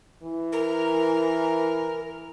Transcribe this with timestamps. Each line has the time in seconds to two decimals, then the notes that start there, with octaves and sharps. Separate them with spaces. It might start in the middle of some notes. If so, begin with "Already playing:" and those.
0.23 E3
0.52 A#4